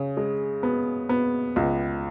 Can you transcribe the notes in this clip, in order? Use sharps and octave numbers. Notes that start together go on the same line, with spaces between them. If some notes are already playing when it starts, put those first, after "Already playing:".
Already playing: C#3
G#3
B3
B3
C#2